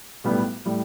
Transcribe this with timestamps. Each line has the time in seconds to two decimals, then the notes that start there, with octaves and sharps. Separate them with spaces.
0.24 B1 A2 G3 B3
0.65 A2 G3